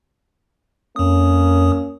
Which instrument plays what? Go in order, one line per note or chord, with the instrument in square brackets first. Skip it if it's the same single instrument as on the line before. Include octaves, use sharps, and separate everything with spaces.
[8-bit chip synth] F2 D#6 [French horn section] A#3 C#4